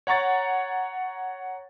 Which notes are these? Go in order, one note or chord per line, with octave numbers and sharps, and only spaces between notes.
C#5 F#5 A#5 C#6 A6